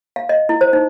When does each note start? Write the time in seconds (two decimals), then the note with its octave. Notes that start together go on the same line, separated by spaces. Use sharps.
0.16 F5
0.29 D#5
0.49 E4
0.61 C5
0.73 D#4